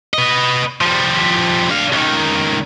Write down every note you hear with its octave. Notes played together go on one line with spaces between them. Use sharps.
B4 D#5
F3 G3
D4 F5
C#2 D#3